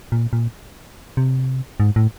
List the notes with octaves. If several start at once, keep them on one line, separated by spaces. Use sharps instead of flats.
A#2
A#2
C3
G#2
A2